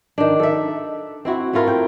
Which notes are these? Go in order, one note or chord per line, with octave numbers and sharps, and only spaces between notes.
D#3 D4
A4 E5
C4 E4 F#4
A3 E4 F4 A#4
G5